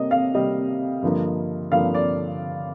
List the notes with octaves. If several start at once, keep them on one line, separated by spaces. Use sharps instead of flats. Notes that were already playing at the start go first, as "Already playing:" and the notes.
Already playing: C3 G3 A#3 D#5
F5
C3 G3 A#3 D#5
G2 D3 F3 A#3
G2 D3 F3 A#3 F5
D5